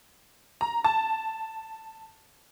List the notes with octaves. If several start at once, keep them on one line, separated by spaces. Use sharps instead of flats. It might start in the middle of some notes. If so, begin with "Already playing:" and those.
A#5
A5